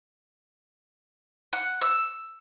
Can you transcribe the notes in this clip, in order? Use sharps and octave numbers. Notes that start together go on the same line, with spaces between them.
F#5
E6